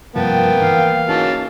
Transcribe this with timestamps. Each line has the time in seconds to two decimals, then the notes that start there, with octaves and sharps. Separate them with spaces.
0.16 G2 C3 F3 A#3 B3 G5 A5
0.62 E3 F5
1.09 E3 F#3 C#4 D#4 G#4 A5